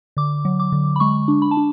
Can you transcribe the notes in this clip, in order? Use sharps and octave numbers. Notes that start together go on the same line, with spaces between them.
D3 D6
F#3
D6
D3
B5
G#3 C#6
D4
B5
A5
D4